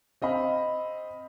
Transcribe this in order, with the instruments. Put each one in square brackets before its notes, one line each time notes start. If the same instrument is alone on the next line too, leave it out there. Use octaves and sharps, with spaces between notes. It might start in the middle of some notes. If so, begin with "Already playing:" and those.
[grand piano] C4 D#5 F5 B5